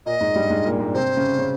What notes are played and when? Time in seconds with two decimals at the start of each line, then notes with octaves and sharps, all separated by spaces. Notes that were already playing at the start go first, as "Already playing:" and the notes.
0.06 A#2 A#3 D#5
0.21 G#2 G#3
0.35 G2 G3
0.50 G#2 G#3
0.65 A#2 A#3
0.79 G#2 G#3
0.94 C3 C4 C5
1.17 C#3 C#4
1.39 C#3 C#4